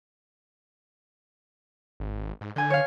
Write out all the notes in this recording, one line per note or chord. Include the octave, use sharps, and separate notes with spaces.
G#1
G#2
D3 G#5 G6
C#5 F5